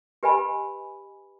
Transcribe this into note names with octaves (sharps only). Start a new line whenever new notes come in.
G4 B4 D#5 G#5 B5